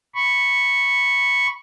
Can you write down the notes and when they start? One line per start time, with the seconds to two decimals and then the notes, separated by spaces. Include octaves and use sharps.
0.14 B5 C#6